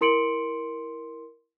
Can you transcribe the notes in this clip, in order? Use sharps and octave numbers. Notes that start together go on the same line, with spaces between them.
E4 A#4 C6 C#7 D7 F#7